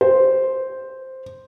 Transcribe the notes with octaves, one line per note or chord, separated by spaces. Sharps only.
C5